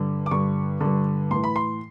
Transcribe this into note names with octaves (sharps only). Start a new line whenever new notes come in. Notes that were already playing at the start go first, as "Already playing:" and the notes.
Already playing: G2 D3
D6
G2 D3 C#6
G2 D3
A2 E3 C6
B5
C6